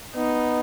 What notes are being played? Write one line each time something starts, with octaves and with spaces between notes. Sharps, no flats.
B3 D#4